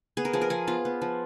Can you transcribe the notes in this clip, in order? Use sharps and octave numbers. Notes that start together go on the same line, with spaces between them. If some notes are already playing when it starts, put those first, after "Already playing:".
B3 G#4
A#4
F3 G#4
A#4
F3 G#4
B3 F4
B3
F3